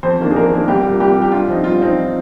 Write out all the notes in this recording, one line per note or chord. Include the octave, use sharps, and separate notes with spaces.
F2 C5
D#3 A#3 D4
G#4
F2 A#4
D#3 A#3 D4
C2 G4
A#2 G3
C2 G4
A#2 G3
G4
G2 F4
F3 C4 D#4
G2 F4
F3 C4 D#4